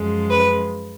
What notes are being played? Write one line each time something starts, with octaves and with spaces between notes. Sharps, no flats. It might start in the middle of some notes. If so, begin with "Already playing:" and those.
Already playing: F#2 F3 G#3
B4